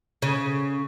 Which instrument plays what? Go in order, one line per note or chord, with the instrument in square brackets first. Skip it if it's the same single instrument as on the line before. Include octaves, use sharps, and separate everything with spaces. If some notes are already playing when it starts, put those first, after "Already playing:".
[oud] C#3